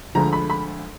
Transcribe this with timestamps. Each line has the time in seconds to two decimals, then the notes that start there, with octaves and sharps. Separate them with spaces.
0.15 D2 D3 F3 G#3 A#5
0.33 B5
0.50 B5